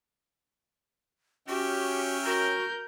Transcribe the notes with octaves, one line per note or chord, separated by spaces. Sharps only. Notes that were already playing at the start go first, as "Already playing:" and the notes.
C#4 F#4 G4 E5 G5 F6
F#4 A#4 G6